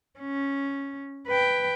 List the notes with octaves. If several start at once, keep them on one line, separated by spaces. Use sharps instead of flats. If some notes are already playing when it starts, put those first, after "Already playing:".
C#4
B4 G5